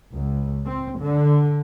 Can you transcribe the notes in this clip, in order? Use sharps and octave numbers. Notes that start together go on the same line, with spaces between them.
C#2
C4
D3